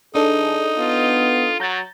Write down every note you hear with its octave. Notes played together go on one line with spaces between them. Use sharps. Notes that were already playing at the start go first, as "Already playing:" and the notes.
E3 D4 D#4 G#4 A4
B3 F4
F#3 A#5 G6 A6